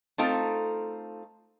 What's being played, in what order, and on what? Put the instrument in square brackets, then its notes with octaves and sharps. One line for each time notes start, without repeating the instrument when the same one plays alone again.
[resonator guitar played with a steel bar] A3 C4 D#4 F4 A4